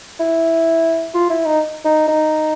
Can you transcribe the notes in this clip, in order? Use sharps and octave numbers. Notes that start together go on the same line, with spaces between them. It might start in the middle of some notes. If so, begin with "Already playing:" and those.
E4
F4
E4
D#4
D#4
D#4